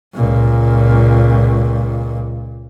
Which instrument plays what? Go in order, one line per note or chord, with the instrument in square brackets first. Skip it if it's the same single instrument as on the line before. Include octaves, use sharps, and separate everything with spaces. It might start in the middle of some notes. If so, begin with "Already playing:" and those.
[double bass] C#2 A#2